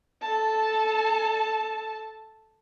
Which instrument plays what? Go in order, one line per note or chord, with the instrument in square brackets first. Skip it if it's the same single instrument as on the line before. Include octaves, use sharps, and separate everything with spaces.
[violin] A4 A5